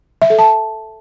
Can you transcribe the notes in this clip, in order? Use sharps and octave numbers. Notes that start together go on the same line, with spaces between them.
E5
A4
A5